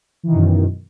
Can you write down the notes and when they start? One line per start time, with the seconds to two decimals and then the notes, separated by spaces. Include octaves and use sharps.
0.23 E3
0.27 D#3
0.31 B2
0.35 F#2